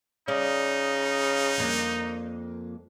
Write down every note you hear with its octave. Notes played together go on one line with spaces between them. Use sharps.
C#3 D#4 D5
F2 A#3 D4